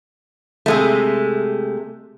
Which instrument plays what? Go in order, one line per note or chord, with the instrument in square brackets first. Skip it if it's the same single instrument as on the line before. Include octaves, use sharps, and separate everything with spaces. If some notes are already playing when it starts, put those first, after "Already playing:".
[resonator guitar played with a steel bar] C3 G#3 A3